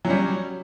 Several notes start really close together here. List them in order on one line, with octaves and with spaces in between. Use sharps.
F#3 C#4 G3